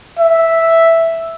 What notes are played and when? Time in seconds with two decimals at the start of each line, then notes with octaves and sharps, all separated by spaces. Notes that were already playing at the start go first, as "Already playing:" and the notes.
0.19 E5